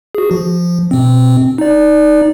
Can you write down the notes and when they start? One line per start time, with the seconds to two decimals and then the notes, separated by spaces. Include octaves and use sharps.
0.15 F#4 G#4
0.31 F3
0.91 B2 C4
1.58 D#4 D5